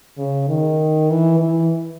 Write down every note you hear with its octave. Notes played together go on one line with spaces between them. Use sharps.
C#3
D#3
E3
E3